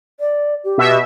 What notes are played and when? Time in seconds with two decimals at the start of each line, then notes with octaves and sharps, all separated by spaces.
0.20 D5
0.64 G4
0.78 B2 E5